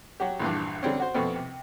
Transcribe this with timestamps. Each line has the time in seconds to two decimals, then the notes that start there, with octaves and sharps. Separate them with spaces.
0.20 F#3 F#4 G4
0.40 A#1 E2 G2
0.83 D3 G3 C4 C#4
1.00 F#4 C5
1.14 F2 B2 A3 B3 C4
1.35 C3